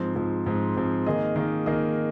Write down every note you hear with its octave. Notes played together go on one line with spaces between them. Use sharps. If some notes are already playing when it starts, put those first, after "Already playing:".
Already playing: G#2 F3 C4
G#2 F3 C4
G#2 F3 C4
G#2 F3 C4
D#3 A#3 G#4 D#5
D#3 A#3 G#4 D#5
D#3 A#3 G#4 D#5